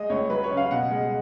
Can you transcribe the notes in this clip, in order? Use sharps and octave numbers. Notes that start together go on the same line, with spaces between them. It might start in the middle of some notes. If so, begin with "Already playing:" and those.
Already playing: G#3 D#5
C#2 C#5
F#3 B4
C#5
C#3
F5
B2 F#5
G#3